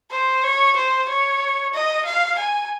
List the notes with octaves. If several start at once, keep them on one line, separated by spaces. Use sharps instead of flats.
C5
C#5
C5
C#5
D#5
F5
G#5